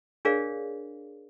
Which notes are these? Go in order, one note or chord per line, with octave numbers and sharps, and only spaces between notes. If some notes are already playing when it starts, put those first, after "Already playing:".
D4 G#4 A#4 C#5 D5 F5